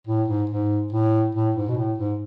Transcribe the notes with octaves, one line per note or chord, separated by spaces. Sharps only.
A2
G#2
G#2
A2
A2
G#2
B2
A2
G#2